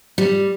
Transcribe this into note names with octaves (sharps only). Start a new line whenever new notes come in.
G3